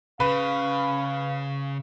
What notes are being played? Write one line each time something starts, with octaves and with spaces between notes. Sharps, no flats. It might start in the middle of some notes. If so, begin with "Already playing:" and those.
C#3 B4 F5